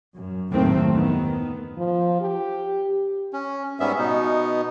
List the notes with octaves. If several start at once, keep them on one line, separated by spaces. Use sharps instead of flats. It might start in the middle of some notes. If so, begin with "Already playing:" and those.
F#2
F#1 D#2 A2 D#3 A3 C4
D#3 B3
F3
G4
C#4
G#2 G3 B3 C#4 E5
B2 B3 D#4